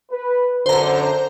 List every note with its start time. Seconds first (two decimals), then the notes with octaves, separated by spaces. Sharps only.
0.11 B4
0.66 F#2 D3 C5 A#5